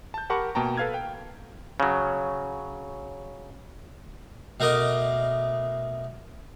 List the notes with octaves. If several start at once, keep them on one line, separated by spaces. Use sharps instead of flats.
A5 G6
G4 A#4 F#5 A5 B5 C#6
B2 A#3 G5 A5 A#5
A4 B4 F5 F6 G#6
G5
C#3 F#3
B2 A3 A#4 D#5 D6